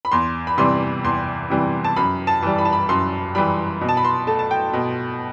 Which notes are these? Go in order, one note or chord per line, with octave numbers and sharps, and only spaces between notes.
B5
E2 C6
B5
C3 E3 G3 C6
E2 C6
C3 E3 G3
A5
F#2 B5
A5
E3 G3
B5
A5
B5
F#2 C6
E3 G3 B5
B2
A5
B5
C6
A3 A5
A5
G5
B2